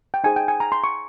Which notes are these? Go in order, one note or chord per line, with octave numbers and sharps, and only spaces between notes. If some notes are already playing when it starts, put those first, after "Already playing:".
G5
D#4 G#4 C5 G#5
G5
G#5
A#5
C6
C#6